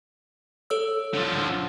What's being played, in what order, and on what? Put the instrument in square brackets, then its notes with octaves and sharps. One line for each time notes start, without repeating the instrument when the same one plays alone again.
[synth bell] A4 C#5 E6
[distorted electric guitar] D3 F3